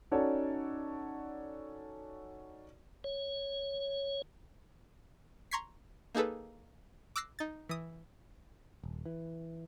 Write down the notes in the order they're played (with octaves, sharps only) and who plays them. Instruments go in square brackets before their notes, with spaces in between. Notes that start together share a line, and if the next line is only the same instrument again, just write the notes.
[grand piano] C#4 D#4 F#4 A4 C#5 D5
[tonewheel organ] C#5
[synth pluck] A#5 C6 C#6 G#6 B6 C7
A#3 D#4 G#4 A4 B4
D6 E6 F#6 A#6 C7
D#4 A6
E3 D#6
[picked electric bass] D#1
E3